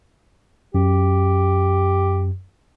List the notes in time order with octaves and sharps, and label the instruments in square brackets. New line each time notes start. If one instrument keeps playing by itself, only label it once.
[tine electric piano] F#2 [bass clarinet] G4